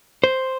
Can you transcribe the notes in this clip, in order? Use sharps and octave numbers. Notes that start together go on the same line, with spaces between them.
C5